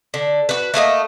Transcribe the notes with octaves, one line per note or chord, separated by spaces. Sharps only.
D3
F#4 B4
A3 A#3 G#4 D#5